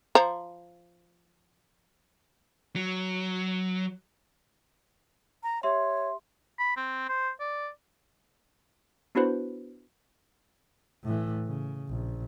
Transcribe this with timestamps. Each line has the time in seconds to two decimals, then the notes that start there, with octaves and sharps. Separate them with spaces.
0.15 F3 C5 A#5
2.76 F#3
5.43 A#5
5.63 G4 C#5 E5 C6
6.59 B5
6.77 C4
7.09 C5
7.40 D5
9.15 B3 D4 E4 F#4 B4 C5
11.04 A2 E3
11.48 C#3
11.89 A#1